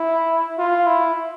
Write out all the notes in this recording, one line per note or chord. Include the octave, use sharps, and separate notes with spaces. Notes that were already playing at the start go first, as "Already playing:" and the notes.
Already playing: E4
F4
E4